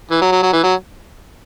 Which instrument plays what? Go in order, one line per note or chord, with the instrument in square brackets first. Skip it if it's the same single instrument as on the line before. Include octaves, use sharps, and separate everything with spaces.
[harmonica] E3
F#3
F#3
F#3
E3
F#3